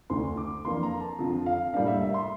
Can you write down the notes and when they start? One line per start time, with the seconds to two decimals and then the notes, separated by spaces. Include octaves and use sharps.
0.10 D2 D3 A3 D4 C6
0.37 D6
0.65 F2 E3 A#3 D4 C6
0.83 A#5
1.00 A5
1.19 F2 D3 F3 C4
1.46 F5
1.74 A2 G3 A#3 D4 F5
1.87 E5
2.01 E5
2.14 C6